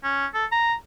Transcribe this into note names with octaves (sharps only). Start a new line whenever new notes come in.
C#4
A4
A#5